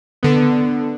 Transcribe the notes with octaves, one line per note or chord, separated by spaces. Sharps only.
D3 B3